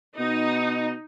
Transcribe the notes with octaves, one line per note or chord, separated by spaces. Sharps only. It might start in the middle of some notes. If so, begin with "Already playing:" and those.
B2 D#4